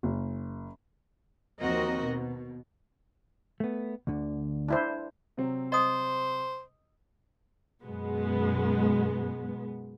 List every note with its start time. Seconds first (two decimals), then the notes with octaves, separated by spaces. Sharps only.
0.03 F#1
1.61 D#2 F3 C4 F#4 A#4 D#5
2.05 B2
3.60 A3 B3
4.07 D2 D3
4.68 D4 E4 C5
5.37 C3 F#3 C4
5.72 C5 D#5 D#6
7.83 F#2 B2 G#3 B3